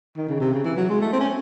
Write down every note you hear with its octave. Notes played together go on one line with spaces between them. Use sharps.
D#3
C#3
C3
C#3
E3
F#3
G#3
A3
C4
C#4